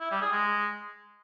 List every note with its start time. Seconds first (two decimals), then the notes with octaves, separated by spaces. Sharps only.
0.01 E4
0.11 G3
0.22 G#4
0.33 G#3